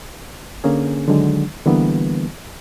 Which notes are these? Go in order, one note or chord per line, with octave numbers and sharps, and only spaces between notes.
D3 A#3 C#4 G#4
D3 D#3 F#3 G#3
D3 E3 G3 A#3 B3